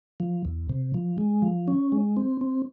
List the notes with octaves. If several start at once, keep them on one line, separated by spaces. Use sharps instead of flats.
F3
E2
C3
F3
G#3
F3
C#4
G#3
C4
C4